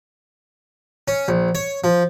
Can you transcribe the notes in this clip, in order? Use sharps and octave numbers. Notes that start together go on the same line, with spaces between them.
C#4
A#1
C#5
F3